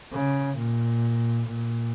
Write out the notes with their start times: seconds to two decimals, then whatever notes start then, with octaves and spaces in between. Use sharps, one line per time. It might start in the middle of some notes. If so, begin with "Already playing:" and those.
0.12 C#3
0.57 A#2
1.47 A#2